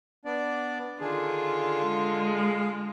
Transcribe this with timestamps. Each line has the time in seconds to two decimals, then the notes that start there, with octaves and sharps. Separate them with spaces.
0.25 B3 D4 D5
1.01 D3 D#3 D4 F4 G#4
1.85 G#3
2.36 G#4 F5